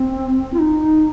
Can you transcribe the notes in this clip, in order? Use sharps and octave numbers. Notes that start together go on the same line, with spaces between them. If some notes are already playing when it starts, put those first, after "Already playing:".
Already playing: C4
F4
D#4